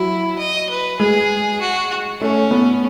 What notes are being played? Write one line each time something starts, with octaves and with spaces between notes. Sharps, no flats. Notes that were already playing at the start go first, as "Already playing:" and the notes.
Already playing: F#3 E4
D#5
B4
G#3 G#4
F#4
A3 C#4
B3